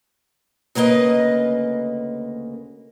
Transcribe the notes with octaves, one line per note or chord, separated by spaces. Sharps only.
D2 C#3 A#3 B4 D#5